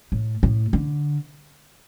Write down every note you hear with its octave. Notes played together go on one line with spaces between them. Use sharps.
A2
A2
D3